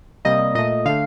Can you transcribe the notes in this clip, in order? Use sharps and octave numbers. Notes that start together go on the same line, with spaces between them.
C3 G3 A#3 D#5
A#2 A3 D#5
D3 A3 F5